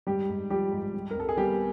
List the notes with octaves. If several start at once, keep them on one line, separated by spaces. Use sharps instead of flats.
G#2 G3 G4
G#2
F3 G3 G4
G#2
G3
A#4
C2 A4
G#4
G3 B3 G4